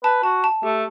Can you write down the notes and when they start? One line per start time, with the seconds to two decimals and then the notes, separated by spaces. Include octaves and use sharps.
0.04 B4 A5
0.23 F#4 A5
0.44 A5
0.63 A3 G4